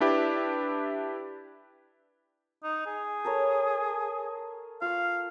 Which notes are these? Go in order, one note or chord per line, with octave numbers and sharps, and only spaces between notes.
D4 E4 G4 B4 D5 E5
D#4
G#4
A4 A#4 C#5
F4 F5 C#6